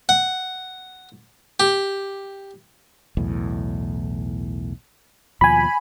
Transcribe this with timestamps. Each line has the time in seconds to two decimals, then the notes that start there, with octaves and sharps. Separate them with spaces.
0.09 F#5
1.60 G4
3.17 B1 E2 A2
5.41 D#2 B2 F3 G#5 B5